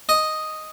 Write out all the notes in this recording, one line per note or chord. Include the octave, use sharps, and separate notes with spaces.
D#5